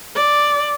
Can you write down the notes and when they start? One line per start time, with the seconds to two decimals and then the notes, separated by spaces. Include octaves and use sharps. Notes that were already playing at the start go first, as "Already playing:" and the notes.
0.15 D5